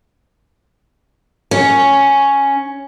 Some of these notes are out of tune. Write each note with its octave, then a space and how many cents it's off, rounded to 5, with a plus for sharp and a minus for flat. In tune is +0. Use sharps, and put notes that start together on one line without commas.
C#4 +0 C#5 +0